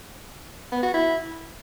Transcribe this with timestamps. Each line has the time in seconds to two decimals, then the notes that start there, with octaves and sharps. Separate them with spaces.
0.72 B3
0.83 F#4
0.94 E4